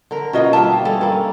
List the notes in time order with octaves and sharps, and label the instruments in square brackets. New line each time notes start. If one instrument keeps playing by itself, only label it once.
[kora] D3 A#4
[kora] B2 A#3 [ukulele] C#4 F4 D#5
[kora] G3 E5 [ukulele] F4 A5
[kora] G3 C#4 G#4 [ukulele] A4
[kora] G2 A#3